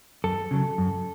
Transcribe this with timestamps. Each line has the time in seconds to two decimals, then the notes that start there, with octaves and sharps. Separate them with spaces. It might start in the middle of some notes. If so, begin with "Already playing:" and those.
0.24 F#2 A4
0.51 C#3 F#3
0.78 F#2